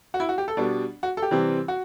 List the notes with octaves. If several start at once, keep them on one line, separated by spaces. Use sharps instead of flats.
F#4
E4
F#4
G4
A4
B2 G3 B3 D4
F#4
A4
G4
C3 E3 G3 C4
F#4